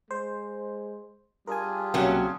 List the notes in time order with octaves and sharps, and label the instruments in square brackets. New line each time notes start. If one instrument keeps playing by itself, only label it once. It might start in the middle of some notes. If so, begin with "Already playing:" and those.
[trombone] G#3 [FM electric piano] C5
[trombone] G3 [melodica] D4 F4 G#4 [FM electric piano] A#4 G#5
[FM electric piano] B1 A#3 F#5 [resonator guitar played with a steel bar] C3 F#3 C#4